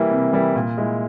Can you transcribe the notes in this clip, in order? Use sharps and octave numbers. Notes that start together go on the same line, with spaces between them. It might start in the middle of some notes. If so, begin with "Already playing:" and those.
Already playing: E3 G3 A#3 E4
C3
E3 G3 A#3 E4
A#2
G#3 E4